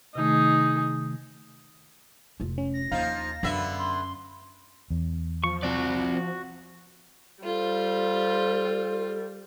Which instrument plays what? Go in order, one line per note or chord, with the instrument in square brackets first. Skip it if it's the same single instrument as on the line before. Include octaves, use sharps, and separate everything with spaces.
[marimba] C3 D#3 A3 [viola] D#4 G#4
[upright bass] F1 F4
[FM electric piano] C#4
[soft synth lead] A#6
[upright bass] D#2 [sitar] F3 D#4 [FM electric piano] F5
[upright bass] F#2 [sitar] D3 B3 E5
[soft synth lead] C6
[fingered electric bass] E2
[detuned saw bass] F3 [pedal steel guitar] C#6
[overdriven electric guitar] C4 D5 [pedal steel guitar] F#4
[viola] G3 [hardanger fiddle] F4 C5 [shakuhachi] A4